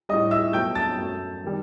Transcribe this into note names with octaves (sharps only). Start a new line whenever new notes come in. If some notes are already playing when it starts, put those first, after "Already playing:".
A2 G3 D#5 D#6
E5 E6
B2 F#3 A3 G5 G6
A5 A6
F#2 F#3 A3
D#3 G3